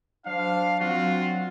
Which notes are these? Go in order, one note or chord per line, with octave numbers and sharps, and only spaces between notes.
F#3 D4 C5 F5
F#3 C4 D4 F4 F#4